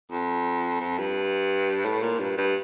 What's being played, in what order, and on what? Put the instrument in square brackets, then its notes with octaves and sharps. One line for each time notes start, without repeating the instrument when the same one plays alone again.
[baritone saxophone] F2
F2
G2
A2
A#2
G2
G2